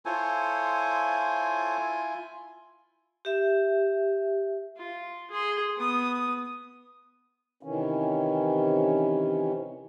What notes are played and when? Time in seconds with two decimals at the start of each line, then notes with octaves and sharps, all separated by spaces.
0.05 E4 F4 A4 C5 C#5 G#5
3.25 G4 E5
4.77 F4
5.31 G#4 C6
5.77 B3 D#6
7.63 C3 D#3 E3 C#4